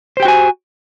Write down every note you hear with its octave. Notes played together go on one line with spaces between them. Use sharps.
F#4 G4 C5 G5 G#5